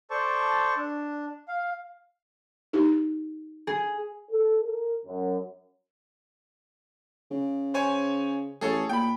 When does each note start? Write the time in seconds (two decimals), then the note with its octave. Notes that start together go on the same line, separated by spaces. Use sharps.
0.11 A4 C5 D5 A5 C#6
0.76 D4
1.48 F5
2.73 D#4 G4
3.67 G#4
4.30 A4
4.63 A#4
5.06 F#2
7.31 C#3
7.74 C5 C#5 G#5
8.61 A1 G#4 A4 C#5
8.89 A#2 G5 B5